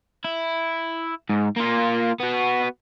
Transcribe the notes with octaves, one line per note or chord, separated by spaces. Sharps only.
E4
G#2
A#3 F4
B3 F#4